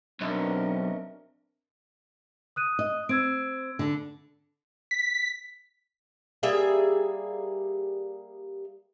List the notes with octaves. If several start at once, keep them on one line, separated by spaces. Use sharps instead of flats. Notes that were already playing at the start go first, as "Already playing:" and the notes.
B1 C4 D4 A#4 C#5 D#5 E5
D#6 F#6 D#7
D#5
C4 E6 G#6 D7
D3 A4
B6
G3 A#3 G#4 E5